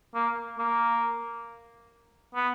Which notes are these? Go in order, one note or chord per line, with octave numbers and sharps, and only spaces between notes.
A#3
A#3
B3